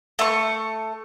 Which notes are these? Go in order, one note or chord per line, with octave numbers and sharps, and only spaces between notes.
A3 C#6